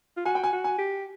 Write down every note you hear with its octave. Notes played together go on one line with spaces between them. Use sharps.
F4
F#4 G#5
G5
G#5
F#4
G#5
G4